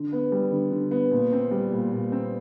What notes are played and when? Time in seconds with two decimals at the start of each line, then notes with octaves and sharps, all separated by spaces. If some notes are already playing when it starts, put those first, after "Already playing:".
Already playing: D3
0.12 B3
0.32 G3
0.51 D3
0.71 D3
0.91 B3
1.11 A#2
1.32 C4
1.51 G3
1.72 A#2
1.91 A#2
2.12 C4